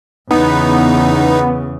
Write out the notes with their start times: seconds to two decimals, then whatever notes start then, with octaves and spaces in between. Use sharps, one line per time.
0.31 E2 C#3 B3 D#4